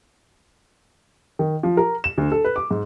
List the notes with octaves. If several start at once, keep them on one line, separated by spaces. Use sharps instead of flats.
D#3
F3
A#4
E7
D2
A4
B4
D6
G#2